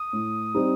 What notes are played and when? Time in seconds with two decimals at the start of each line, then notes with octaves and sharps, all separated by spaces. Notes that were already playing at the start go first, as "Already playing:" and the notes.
Already playing: D#6
0.13 A2
0.54 G3 C4 D#4 G4